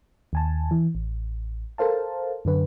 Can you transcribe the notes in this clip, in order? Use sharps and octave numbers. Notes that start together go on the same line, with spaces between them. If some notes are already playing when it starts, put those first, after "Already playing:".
D#2 G#5 A5
E3
A1
A4 A#4 C5 F5 A5
F#2 D3 B4